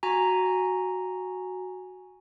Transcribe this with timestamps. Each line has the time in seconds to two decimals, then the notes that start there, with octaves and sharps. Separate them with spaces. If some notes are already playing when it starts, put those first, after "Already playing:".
0.03 F#4 G#5 A#5